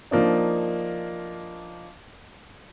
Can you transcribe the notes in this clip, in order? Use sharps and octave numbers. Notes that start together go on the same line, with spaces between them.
F3 A#3 D4 D#4